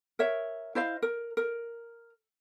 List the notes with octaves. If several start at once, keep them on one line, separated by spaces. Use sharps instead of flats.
A#4 C#5 E5
E4 C5 D#5 F5
A#4
A#4